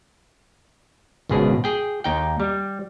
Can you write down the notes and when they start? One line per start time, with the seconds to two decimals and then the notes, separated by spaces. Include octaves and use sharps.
1.29 G#1 C#2 B2 G#4
1.64 G#4 G5
2.04 D#2 D#4 G5
2.40 G3